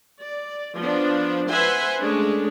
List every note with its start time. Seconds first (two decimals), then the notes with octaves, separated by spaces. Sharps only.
0.22 D5
0.77 F3 B3 D4
1.49 B4 C5 E5 F#5 G#5 C6
2.01 G#3 A3 C#4 D4 G#4 C#5